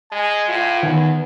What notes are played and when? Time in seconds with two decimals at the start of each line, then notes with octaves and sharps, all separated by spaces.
0.12 G#3 G#5
0.49 A2 F4
0.83 E2 D#3 B3